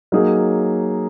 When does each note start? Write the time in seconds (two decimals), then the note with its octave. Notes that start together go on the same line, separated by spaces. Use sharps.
0.12 F#3 A#3 D#4 G#4